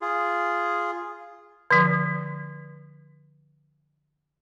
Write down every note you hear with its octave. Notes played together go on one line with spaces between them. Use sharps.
F4 G#4
D3 F3